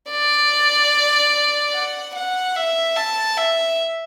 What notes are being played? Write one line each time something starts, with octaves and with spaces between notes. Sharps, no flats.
D5
F#5
F#5
E5
A5
E5